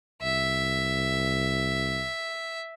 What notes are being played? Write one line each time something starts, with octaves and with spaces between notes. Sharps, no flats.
C2 E5